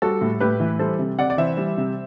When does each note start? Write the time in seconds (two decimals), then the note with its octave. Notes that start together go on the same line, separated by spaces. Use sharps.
0.02 G3 F#4 A4
0.21 A2
0.40 A2 G4 B4
0.60 E3
0.79 G3 A4 C5
0.99 C3
1.19 C3 D5 F#5
1.30 D5
1.38 E3 C5 E5
1.57 G3
1.78 C3